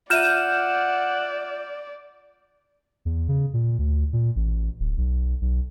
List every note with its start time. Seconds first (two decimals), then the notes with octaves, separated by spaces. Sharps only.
0.10 F4 D5 E5 F#5 F6 G6 D#7 E7
3.05 E2
3.28 C#3
3.54 A#2
3.79 D2
4.13 A#2
4.36 A1
4.80 D1
4.97 B1
5.41 B1